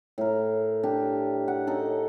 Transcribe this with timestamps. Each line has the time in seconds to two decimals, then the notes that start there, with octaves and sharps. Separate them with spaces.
0.18 A2 A#4
0.83 D4 G4
1.48 F#5
1.67 C#4 D#4 A4